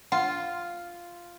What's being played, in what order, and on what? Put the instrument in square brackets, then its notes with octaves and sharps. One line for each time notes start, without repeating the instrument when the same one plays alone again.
[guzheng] F4 [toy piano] F#5